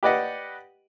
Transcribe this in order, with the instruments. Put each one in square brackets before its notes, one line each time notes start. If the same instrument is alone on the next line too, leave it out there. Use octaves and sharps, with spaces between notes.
[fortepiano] G4 B4 D5 D#5 F#5